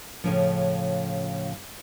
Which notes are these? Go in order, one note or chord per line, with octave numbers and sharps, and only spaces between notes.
A2 C#3 F3